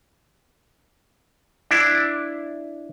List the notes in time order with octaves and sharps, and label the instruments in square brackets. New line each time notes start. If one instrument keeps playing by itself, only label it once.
[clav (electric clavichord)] D4 E4